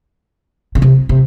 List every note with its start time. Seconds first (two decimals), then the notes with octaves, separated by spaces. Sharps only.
0.75 C#3
0.82 C3
1.09 C3